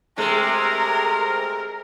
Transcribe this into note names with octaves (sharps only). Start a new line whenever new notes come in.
C3 G#3 A3 A#4